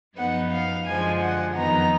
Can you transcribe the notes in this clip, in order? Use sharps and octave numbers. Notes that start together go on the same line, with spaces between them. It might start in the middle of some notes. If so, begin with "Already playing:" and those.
F#2 F3 B3 D#4 F#5
F5
F#2 D3 F3 G#3 G#5
F#5
F2 D#3 F#3 B3 D#4 A#5